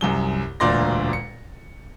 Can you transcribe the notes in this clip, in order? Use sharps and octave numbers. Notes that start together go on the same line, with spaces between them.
C2 F#2 G7
E1 D2 A#2 D5 C6 A#6
C#7